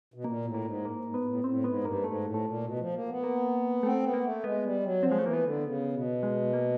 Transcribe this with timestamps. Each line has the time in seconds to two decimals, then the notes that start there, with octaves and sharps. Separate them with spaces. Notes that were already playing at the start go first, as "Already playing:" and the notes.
0.14 B2
0.24 A#2 A#3
0.45 A2
0.54 A#3
0.65 G#2
0.85 A#3
1.05 G#2
1.14 B3
1.20 G#2
1.25 A2
1.44 A2 C4
1.64 G#2 B3
1.84 G2 A#3
2.04 G#2 A3
2.24 A2
2.34 A3
2.44 A#2
2.64 B2
2.79 F3
2.94 A#3
3.09 B3
3.24 A#3
3.83 A3 C4
4.04 B3
4.13 A#3
4.24 A3
4.44 G#3 B3
4.64 G3
4.83 F#3
5.03 F3 C4
5.12 G#3
5.19 A3
5.23 E3 A#3
5.33 B3
5.43 D3
5.64 C#3
5.93 B2
6.23 G#3
6.53 A#3